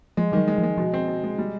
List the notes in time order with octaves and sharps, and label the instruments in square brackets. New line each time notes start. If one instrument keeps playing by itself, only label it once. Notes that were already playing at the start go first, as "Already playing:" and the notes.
[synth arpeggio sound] F3 [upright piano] G#3
[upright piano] D#3 [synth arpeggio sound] F#3 G3
[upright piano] G#3
[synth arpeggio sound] F3
[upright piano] G#3
[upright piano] B2 [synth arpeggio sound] F3
[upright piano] C4
B2
G#3
G3